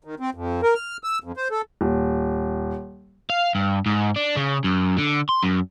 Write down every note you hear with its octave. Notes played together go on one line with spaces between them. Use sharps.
D#3
C4
F2
A#4
F6
E6
F2
C5
A4
D#1
F5
G2
G#2
D4
C#3
F#2
D3
C6
F#2